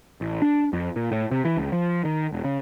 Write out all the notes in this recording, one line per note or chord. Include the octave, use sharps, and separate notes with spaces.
A1
D4
F2
A#2
A2
C3
E3
C#2
F3
D#3
E1
C#3